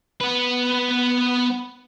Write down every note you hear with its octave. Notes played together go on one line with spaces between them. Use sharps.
B3 B4